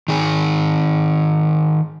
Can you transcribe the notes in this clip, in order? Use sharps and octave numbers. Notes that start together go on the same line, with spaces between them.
D#3 G#4